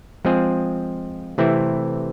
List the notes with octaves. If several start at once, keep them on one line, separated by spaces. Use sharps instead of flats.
F3 G#3 C4 F4 G#4
C3 E3 A3 C4 E4